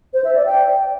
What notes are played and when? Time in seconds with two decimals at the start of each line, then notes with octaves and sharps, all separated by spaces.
0.13 C5
0.24 E5
0.35 D5
0.46 G5